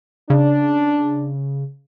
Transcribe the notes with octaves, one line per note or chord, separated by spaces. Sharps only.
C#3 D4